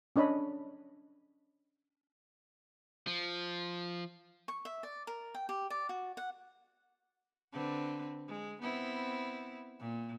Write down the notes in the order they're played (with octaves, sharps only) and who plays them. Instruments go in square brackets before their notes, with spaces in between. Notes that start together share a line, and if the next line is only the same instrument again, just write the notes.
[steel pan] C#4 D4 C#5 D#5 B5
[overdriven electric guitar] F3
[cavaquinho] C#6
E5
D5
A#4
G5
G4
D5
F#4
F#5
[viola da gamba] D3 C4 B4
G#3
B3 C4 E4
A#2